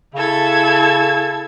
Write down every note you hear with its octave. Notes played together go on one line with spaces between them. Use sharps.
C#3 E4 A4 G#6